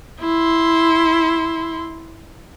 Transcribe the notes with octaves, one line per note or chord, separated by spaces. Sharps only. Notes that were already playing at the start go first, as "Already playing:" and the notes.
E4 C6